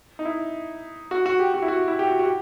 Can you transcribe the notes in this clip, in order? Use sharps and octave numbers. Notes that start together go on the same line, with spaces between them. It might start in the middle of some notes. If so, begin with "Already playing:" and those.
D#4
E4
F#4
F#4
G4
F#4
E4
F#4
E4
G4
F#4
F#4
G4